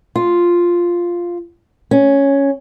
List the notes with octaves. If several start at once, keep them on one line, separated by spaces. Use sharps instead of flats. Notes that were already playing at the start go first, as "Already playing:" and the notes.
F4
C#4